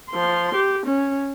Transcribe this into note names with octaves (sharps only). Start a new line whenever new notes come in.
F3 C6
G4
C#4